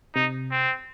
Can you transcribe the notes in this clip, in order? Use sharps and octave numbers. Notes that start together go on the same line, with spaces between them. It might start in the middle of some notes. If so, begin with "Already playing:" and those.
C3 D#4
C4